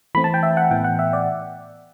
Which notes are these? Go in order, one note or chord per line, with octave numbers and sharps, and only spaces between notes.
E3 A3 C4 B5
A5
G5
E5
F#5
A2 E3 B3 G5
F#5
E5
D5